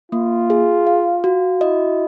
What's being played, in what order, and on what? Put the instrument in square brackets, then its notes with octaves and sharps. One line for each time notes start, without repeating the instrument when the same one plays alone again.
[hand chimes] A#3 [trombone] F4
[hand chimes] G#4
F5
F#4
[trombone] E4 [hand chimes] D#5